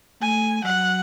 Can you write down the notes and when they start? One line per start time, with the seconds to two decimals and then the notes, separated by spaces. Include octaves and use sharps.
0.21 A3 G#5
0.64 F#3 F#5